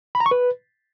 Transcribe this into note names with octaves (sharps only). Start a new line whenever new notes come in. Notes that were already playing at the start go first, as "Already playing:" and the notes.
B5
A#5
C#6
B4